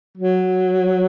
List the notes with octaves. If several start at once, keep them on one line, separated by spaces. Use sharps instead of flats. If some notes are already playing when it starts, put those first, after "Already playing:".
F#3